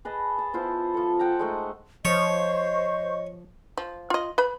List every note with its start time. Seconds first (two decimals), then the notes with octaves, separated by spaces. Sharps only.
0.05 G#4 B4 D#5 A5
0.38 A5
0.53 B3 E4 F4 C5
0.94 F3 A4
1.19 F#5 G5 A5 A#5
1.39 G#3 A3 D#4
2.05 F3 C5 C#5 D#5 C#6
3.77 F3
4.10 F4 D#5
4.38 B4 B5